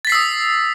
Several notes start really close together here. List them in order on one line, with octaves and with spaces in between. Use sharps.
A6 B6 C7 E6 D#6